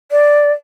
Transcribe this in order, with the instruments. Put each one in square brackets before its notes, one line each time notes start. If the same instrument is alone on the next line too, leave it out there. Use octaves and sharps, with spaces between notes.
[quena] D5